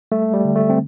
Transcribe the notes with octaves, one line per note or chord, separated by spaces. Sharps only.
G3 A3
G3
D3
A3
C4